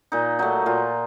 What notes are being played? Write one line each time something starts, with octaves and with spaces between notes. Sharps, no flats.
A#2 D#4
F#3 A3 D#4
A#2 F4